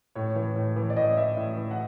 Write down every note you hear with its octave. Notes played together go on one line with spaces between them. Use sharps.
A2 C#5
E3
A2
E3
D5
A2 D#5
E3 E5
A2
E3
F#5